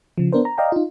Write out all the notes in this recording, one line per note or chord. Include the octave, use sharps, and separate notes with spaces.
C#3 F3
B3 D4 A#4 C5
A#5
D5 D#5 F5 G5 A#5
D#4 F4